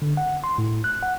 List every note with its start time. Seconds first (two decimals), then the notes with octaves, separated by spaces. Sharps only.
0.02 D3
0.17 F#5
0.44 C6
0.58 A2
0.84 F#6
1.02 F#5